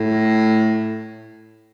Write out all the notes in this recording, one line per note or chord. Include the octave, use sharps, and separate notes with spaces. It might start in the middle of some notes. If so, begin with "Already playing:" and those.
Already playing: A2